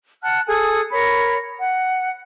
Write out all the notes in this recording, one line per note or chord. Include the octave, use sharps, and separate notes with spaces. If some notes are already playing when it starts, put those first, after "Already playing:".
F#5 A5 F6 F#6
G#4 A4 G#5 D#6
A#4 C#5 B5
F#5